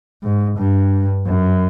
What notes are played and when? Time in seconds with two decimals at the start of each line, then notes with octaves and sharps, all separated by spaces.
0.23 G#2
0.58 G2
1.26 F#2